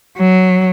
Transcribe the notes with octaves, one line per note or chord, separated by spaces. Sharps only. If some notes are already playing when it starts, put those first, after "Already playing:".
F#3